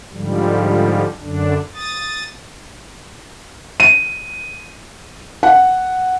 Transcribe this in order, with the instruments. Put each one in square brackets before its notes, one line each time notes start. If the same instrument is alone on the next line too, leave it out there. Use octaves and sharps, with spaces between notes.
[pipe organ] G#2 D3 F3 G3
F#2 D3 D4
D#6 A6
[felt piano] D#7
F#5